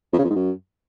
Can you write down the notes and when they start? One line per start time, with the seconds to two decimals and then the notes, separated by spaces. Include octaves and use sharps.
0.13 F2
0.19 C#3
0.24 F2
0.30 G#2
0.36 F#2